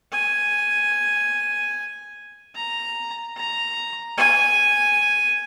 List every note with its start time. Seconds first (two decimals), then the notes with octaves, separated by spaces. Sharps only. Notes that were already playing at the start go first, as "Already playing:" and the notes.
0.12 G#5
2.55 A#5
3.37 A#5
4.18 G#5